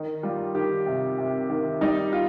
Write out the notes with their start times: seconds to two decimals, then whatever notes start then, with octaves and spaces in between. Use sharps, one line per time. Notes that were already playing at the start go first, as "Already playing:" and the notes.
Already playing: D#3 D#4
0.23 G3 F4
0.55 D#3 G4
0.86 C3
1.18 C3
1.50 D#3
1.81 G3 D#4
2.13 F4